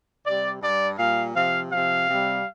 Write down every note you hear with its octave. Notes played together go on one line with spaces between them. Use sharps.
C3 G3 D5
G2 G3 D5
A#2 G3 F5
C3 F3 F5
C3 F3 F5
C3 G3